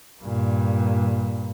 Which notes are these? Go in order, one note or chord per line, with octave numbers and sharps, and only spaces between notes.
G2 A#2